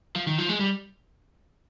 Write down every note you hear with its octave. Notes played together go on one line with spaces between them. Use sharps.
F3
D#3
F3
G#3
G3